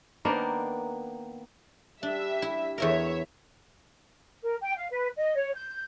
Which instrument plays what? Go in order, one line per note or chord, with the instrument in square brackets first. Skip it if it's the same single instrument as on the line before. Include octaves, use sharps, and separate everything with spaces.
[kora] D#3 A#3 B3 D4
[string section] G3 E5 [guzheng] D4
[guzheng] E4
[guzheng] E2 E4 A#4 [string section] C#5 E5
[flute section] A#4
G5
F5
B4
D#5
C#5
G6